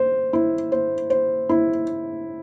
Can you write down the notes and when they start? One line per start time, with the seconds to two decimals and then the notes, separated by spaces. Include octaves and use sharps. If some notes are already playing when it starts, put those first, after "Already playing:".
Already playing: C5
0.33 E4
0.72 C5
1.10 C5
1.49 E4